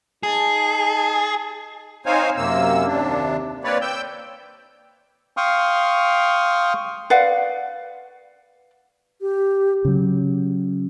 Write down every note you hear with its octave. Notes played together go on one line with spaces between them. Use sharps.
D#4 G#4 A5
C4 D#4 C5 C#5 F5 G#5
F#2 C3 A#3 E6
D#2 C3 D4
A#3 C4 B4 C#5 D5
G5 E6 G6
F5 G5 C6 C#6 D#6 F6
B4 D5 F5 F#5
G4
C#3 F#3